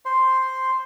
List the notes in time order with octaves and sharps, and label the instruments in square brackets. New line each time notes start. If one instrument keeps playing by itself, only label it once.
[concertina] C5 C6